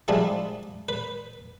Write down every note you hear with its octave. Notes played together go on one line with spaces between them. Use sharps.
F3 G3 G#3 D4 E4
B4